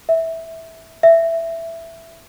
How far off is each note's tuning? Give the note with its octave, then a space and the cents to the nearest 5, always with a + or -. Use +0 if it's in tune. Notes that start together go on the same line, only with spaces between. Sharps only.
E5 -10
E5 +10